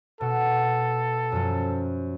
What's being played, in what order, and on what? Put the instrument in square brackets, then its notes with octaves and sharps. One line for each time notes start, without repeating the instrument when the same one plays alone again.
[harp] B2 [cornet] A4 [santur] F#5
[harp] F#2 F3